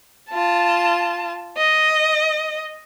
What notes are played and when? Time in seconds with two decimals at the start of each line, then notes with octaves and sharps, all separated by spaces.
0.30 F4 A5
1.58 D#5